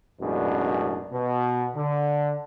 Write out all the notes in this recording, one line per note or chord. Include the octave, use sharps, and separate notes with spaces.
A1 F#2 B2 G#3 D4
B2
D3